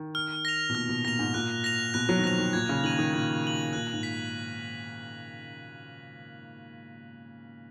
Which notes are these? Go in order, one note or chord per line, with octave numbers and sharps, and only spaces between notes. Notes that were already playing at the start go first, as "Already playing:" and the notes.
Already playing: D#3
F6
A#6 F7
B2
A#2 F6
B2
A#2 A#6 F7
G#2
A#2 F#6
A#6 F7
B2 F#6
F#3
D#3
F3 A#6 F7
D#3
A#2 G#6
C#3
D#3 D#7 F#7
D#3
A#2 G#6
D#7 F#7
A#2 F#6
G#2
B6